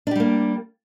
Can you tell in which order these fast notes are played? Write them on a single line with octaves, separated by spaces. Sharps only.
D4 G4 G3 A#3